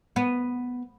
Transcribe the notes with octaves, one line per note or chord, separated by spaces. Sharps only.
B3